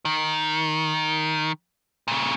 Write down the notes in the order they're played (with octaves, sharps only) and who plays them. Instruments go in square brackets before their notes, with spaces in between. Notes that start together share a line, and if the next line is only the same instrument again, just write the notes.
[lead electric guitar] D#3
A#2 C#3